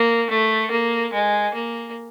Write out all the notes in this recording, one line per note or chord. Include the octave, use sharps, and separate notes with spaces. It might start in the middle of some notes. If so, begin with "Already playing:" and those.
Already playing: A#3
A3
A#3
G#3
A#3